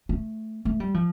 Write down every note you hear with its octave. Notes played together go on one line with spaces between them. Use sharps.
A3
A3
G3
F3